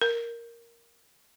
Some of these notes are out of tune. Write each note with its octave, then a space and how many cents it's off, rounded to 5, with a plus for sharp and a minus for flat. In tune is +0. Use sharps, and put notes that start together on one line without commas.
A#4 +0